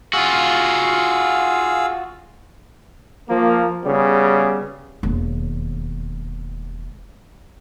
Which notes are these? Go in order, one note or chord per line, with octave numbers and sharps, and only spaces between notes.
F4 F#4 G#4 F5 E6
F3 A#3
C#3 G3 B3
E1 D#2